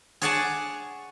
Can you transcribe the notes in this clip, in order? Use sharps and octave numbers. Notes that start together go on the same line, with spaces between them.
G#4 C#5 D5 F#5 G#5 A5